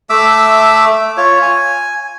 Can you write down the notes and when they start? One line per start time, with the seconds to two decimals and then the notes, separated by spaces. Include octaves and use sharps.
0.10 A3 E5 D6 E6
1.17 F4 C#5
1.42 G#5